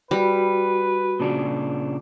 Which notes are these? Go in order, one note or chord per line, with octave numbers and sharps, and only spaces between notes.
G3 F#4 B4
A#2 C#3 D4